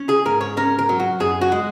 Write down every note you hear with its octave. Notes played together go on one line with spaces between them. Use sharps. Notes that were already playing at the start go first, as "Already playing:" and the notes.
Already playing: C#4
G#4
G#2 A#4
C#5
C#4 A#4
A#4
F#3
F#4
F#2 G#4
F#4
G#3